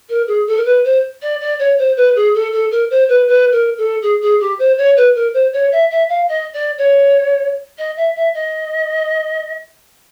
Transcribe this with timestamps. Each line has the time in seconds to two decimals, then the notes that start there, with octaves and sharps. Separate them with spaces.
0.09 A#4
0.27 G#4
0.47 A4
0.57 A#4
0.65 B4
0.84 C5
1.22 D5
1.40 D5
1.59 C#5
1.78 C5
1.96 B4
2.15 G#4
2.34 A4
2.52 A4
2.71 A#4
2.90 C5
3.09 B4
3.28 B4
3.52 A#4
3.78 A4
4.02 G#4
4.21 G#4
4.40 G4
4.59 C5
4.77 C#5
4.97 B4
5.15 A#4
5.34 C5
5.53 C#5
5.72 E5
5.90 E5
6.09 F5
6.28 D#5
6.53 D5
6.78 C#5
7.78 D#5
7.96 E5
8.15 E5
8.34 D#5